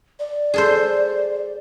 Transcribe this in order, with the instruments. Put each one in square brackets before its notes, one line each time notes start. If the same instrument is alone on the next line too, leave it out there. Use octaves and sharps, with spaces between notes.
[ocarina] D5
[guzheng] G#4 A4 C5